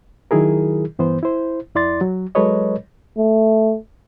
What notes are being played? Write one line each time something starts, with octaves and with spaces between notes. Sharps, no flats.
D#3 F#3 E4 G#4 A#4
G2 E3 B3 C5
E4 C5
F2 E4 D5 C6 A6
F#3
F#3 G#3 A4 B4 C#5 D#5
A3